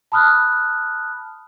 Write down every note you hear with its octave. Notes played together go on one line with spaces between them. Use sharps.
A5 B5 D#6 F6 F#6